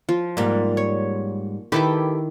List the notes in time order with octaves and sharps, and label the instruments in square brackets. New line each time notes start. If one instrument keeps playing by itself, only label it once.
[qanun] F3 F4
[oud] G#2 G3 [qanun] A#3
[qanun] C#5
[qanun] D#3 E4 D6 [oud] G4 A4 B4